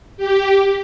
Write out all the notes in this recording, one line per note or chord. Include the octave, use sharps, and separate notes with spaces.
G4